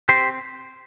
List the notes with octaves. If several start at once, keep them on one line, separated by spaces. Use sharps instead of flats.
C4 G4 C5